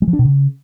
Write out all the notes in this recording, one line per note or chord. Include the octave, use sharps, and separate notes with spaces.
G3
F3
D4
B2
C#3